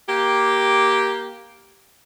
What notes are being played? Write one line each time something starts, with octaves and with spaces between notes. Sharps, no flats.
A#3 G4